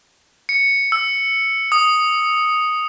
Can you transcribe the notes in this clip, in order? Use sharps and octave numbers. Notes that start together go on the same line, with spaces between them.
C#7
E6
D#6